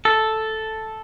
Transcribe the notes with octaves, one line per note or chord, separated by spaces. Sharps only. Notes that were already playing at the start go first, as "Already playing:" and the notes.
A4